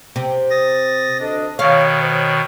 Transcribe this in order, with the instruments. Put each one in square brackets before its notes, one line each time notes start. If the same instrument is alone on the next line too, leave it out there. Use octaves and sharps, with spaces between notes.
[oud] C3
[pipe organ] D#6 A6 A#6
[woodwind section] D2 D4 D#5
[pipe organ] B2 D#3 [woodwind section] C#5 [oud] F5
[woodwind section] C5 C#5